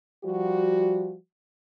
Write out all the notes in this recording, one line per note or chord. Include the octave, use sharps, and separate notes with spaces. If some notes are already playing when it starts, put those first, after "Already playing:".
F3 G3 F#4